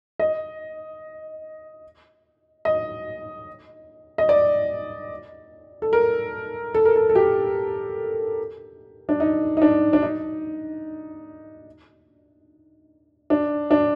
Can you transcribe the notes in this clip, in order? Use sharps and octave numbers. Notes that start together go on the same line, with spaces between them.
D#5
D#5
D#5
D5
A4
A#4
A4
A#4
A4
A4
G4
D4
D#4
D#4
D4
D4
D#4
D4
D4